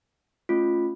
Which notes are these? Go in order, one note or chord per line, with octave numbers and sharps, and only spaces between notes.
A3 C#4 F4